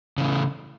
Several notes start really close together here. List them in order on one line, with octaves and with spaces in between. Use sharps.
C#3 E3 A3